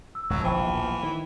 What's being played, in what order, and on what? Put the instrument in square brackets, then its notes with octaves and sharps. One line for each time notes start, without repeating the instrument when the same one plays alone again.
[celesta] E6
[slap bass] D1 C#2 G#3 [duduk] F3 [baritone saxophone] F#3
[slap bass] D1 A#1 B2 [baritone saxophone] E3 [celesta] C5 G5
[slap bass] D#3 [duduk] E4